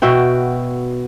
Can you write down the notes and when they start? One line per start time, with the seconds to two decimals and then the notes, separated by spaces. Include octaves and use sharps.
0.02 B2 F#4 E5 G5